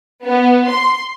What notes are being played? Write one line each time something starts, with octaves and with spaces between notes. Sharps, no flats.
B3
C6